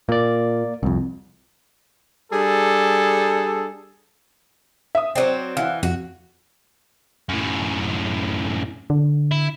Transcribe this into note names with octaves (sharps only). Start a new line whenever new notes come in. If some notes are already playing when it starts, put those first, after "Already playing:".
A#2 A#3 D5
C2 F2
G3 D4 G#4 A4
E5 D#6
F#3 C4 C5 D5
E3 F5 F#5
F2 F#4
F#2 A2
D3
E4